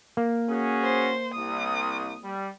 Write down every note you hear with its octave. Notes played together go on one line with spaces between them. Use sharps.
A#3
C#4 F#4 G#4
C5
C2 D#6
G3